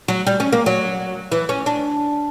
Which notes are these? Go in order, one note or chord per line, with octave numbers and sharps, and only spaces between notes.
F#3
G3
C#4
A#3
F#3
E3
C#4
D4